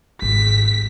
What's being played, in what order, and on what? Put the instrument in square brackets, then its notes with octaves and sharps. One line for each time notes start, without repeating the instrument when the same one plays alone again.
[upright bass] G#1 [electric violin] B6